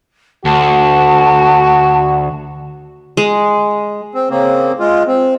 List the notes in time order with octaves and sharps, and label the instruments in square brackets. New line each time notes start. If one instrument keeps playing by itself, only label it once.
[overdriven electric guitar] D2 [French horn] F#4 [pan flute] A5
[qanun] G#3
[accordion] C4
C#3 A#3 C4
G#3 F4
C4